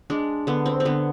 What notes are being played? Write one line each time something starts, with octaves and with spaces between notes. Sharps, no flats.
G#3 D4
D3 B3
C4
C4
D3 B3